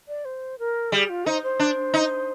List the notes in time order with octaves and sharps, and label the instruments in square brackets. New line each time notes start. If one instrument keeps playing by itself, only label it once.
[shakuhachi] D5
C5
A#4
[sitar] G3 [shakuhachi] G#4
[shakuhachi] F4
[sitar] D#4 [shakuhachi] C5
[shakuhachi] C5
[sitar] D4
D#4